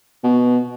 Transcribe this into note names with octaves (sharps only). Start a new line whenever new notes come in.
B2